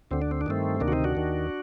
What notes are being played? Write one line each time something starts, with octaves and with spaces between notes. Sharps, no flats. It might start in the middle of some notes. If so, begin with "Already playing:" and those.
D2 D3 C4
D4
C4
D4
G2 D#3 A3 C4
D2 C3 D#3 A#3 D4
F#4
C4 D#4
D4 F#4
D#2 D#3